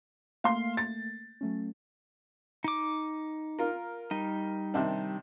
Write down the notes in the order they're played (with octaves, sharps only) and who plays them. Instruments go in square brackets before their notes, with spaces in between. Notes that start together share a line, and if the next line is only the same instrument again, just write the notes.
[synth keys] A3 A#3 [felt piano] F5 C6
[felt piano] A6
[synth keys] F#3 A3 C#4
[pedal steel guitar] D#4 D6
[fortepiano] F4 A#4
[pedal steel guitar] G3 D#4
[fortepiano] C3 D#3 D4